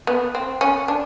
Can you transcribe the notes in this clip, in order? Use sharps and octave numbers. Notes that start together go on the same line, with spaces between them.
B3
C4
C#4
D4